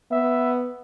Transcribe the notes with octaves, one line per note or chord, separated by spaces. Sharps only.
B3 E5